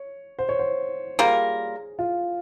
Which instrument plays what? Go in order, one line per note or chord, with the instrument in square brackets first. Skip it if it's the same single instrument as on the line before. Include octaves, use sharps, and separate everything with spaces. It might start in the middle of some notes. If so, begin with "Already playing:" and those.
Already playing: [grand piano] C#5
C5
C#5
C5
[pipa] G3 A#3 F4 A#4 [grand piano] G#4
[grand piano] F4